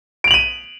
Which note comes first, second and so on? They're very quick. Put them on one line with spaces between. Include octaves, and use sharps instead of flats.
D7 F7 F#7 D#7